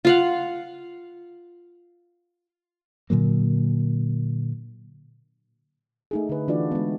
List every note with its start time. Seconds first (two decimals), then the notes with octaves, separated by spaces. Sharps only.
0.05 F4 F5 F#5
3.10 A#2 D3 F#3 A#3
6.11 A3 D#4 G#4
6.29 D3 B4
6.48 E3 D4 F4 F#4 B4 D5
6.71 G#3 B3